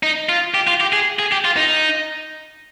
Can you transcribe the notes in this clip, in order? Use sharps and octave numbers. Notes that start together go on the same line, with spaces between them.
D#4
F4
G4
F4
G4
G#4
G#4
G4
F4
D#4